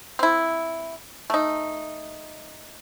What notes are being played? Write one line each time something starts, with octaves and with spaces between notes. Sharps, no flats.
C4 E4
A3 D#4